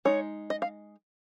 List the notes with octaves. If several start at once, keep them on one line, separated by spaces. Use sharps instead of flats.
G#3 D#4 C#5
D#5
F5